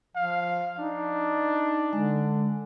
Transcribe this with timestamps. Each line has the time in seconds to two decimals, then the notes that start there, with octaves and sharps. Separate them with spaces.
0.16 F3 F5
0.79 D4 D#4
1.93 D3 G#3